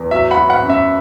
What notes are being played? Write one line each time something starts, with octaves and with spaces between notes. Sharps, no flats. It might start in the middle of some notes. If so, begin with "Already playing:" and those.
Already playing: E2
F#3 E5
F#5 B5
F#3
F#5
F#2
E5